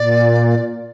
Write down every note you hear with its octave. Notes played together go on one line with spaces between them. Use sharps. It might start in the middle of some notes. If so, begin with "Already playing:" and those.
Already playing: A#2 D5